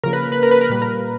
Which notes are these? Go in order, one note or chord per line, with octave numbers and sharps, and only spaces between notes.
C#3 F3 A#3 A#4
B4
A#4
B4
A#4
B4
A#4
A#2 G3 A#3 B4
A#4